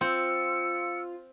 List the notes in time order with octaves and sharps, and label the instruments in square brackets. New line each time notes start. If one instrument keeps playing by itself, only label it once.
[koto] C4 [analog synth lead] F4 [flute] E6 [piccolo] C#7